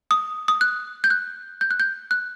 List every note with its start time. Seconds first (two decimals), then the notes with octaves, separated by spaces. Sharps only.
0.11 D#6
0.48 D#6
0.61 F#6
1.04 G6
1.10 F#6
1.61 G6
1.71 F#6
1.80 G6
2.11 F#6